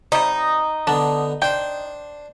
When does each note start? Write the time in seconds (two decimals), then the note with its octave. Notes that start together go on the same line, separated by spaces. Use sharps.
0.12 C3 G3 D#4
0.87 D3 B3 D4
1.42 D4 C5 G5